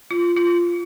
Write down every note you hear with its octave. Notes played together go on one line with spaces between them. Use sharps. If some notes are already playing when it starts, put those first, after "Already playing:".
F4
F4